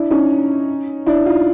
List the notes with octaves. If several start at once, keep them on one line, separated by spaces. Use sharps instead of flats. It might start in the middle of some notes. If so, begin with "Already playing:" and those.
Already playing: D4 E4
C#4 D#4
D4 E4
D#4 F4